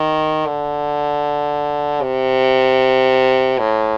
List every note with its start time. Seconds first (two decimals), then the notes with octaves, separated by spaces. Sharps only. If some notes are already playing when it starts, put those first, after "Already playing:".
Already playing: D#3
0.46 D3
2.02 C3
3.59 A2